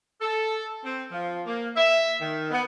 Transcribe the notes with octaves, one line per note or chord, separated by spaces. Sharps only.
A4
C4
F3
A#3
E5
D#3
B3